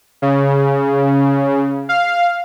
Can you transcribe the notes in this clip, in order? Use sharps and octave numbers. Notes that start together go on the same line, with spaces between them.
C#3
F5